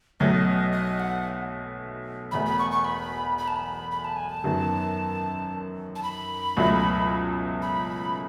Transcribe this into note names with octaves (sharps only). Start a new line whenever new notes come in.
B1 B2 F#3 A3 D#5
D#5
F#5
E1 E2 B2 A3 B5
B5
C#6
C#6
B5
B5
A5
B5
B5
A5
G#5
A5
F#2 D#3 F#3 B3
A5
B5
C#2 B2 F#3 A3 E4
B5